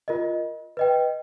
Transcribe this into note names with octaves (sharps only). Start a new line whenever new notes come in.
F4 A#4 D#5
B4 D#5 G5